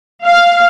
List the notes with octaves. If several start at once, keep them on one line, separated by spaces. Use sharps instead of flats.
F5